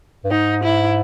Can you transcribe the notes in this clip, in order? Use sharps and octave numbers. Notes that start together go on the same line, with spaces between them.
G2
G#2 D#4
E4